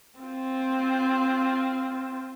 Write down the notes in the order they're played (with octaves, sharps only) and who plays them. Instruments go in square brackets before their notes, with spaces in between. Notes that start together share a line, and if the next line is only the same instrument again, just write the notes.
[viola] C4 F4